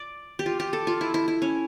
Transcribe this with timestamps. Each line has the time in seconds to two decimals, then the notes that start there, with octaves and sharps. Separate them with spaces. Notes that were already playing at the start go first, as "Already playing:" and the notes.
Already playing: D5
0.39 G4
0.46 F4
0.60 G4
0.73 A4
0.87 F4
1.01 E4
1.14 E4
1.28 E4
1.42 C#4